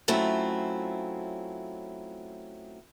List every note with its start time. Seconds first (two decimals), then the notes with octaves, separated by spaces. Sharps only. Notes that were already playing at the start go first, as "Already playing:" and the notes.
0.08 F#3 A3 C4 C#4 E4 F4